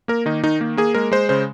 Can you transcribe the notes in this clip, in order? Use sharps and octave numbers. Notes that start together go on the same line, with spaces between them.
A#3 A#4
D#3 D#4
D#3 D#4
A#3
A#3 G#4
G#3 A#4
G#3 C5
C#3 C5